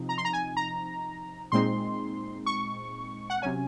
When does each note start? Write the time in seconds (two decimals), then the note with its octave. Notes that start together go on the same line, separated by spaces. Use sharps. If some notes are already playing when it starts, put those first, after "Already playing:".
Already playing: C3 F3 C4 D#4
0.09 A#5
0.18 C6
0.25 A#5
0.33 G#5
0.57 A#5
1.52 A#2 G#3 C4 D#4 C6
2.46 C#6
3.30 F#5
3.42 C3 F#3 C#4 G#5